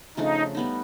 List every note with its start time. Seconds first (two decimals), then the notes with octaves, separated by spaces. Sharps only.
0.17 C#3 F3 A3 D4 D#4
0.55 G3 B3 D#4